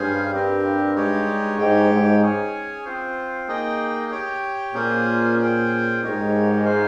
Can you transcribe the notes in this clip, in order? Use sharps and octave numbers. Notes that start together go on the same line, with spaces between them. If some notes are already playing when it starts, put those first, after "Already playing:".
Already playing: G2 C#4 G#4 C5 F5 G#5
C4 G4 A#4
G#3 D#4 G4 C#5
G#2 G4 C#5 G5
G#2
C#4 G#4 C#5 G#5
C4 F4 C5
A#3 D#4 G#4 D#5 G5
G4 C#5 G5
A#2 A#3 C#4 F4 G#4 C5
C#4 G#4 C5 G5
G#2 D#4 G4 A#4 C#5
F4 C5 F5 G#5